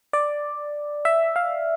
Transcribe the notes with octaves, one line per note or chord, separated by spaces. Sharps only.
D5
E5
F5